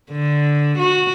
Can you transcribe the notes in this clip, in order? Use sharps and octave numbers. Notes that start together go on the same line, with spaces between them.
D3
F#4